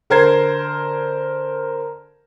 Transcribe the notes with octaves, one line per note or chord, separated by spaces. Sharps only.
D3 A#4 C5 G#6 C7